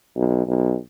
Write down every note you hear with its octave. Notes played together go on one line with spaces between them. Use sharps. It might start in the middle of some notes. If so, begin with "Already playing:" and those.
B1
B1